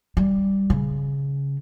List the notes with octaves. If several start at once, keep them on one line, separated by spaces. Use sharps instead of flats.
G3
C#3